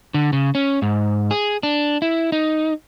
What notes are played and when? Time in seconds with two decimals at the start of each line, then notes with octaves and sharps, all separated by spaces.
0.14 D3
0.33 C#3
0.55 C#4
0.82 G#2
1.31 G#4
1.63 D4
2.02 E4
2.32 D#4